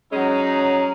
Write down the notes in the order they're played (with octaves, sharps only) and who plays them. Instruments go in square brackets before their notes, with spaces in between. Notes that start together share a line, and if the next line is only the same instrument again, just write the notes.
[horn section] F#3 G#3 C#4 D#4